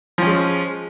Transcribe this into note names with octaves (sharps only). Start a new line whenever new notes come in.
F3 G#3 C#4